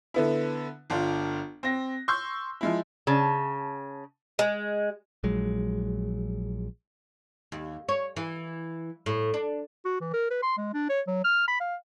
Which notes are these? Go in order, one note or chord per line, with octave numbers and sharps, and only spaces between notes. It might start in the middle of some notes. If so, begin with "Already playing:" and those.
D3 B3 E4
G1 D4 F4
C4 A#6
C6 C#6 E6 G6
F3 G#3 E4
C#3 A5
G#3
A#1 F#3 G#3
D#2
C#5
E3
A2
D4
F#4
E3
A#4
B4
C6
G#3
D4
C#5
F#3
F6
B5
F5